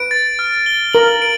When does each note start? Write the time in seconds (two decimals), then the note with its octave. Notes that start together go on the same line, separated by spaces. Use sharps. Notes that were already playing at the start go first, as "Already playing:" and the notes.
Already playing: B4 D7
0.11 A6
0.39 F6
0.66 G7
0.93 A#4 F#7
1.22 D7